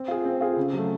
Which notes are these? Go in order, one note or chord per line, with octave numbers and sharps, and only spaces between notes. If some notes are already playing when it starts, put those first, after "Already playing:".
Already playing: C4
F4 G#4
C4
F4 G#4
C#3
F#3 A3